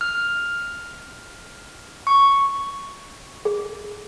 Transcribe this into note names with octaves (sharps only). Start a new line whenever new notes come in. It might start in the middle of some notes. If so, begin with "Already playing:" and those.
F6
C#6
G#4